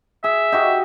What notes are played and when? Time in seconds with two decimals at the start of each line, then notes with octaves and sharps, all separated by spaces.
0.24 G#4 E5
0.52 D#4 F#4 G4